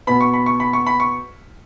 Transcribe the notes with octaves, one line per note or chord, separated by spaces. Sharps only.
B2 B3 B5
C#6
B5
C#6
B5
C#6
B5
C#6